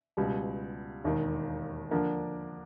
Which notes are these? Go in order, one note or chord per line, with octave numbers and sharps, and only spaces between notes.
C#2 B2 G3
E1 D#2 D#3
D3 F3 A#3 D4